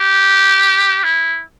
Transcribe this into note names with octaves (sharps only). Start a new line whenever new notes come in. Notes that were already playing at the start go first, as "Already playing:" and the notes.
Already playing: G4
E4